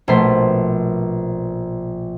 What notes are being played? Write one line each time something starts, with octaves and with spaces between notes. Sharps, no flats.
A#1 B2 A3 C5 C6 B6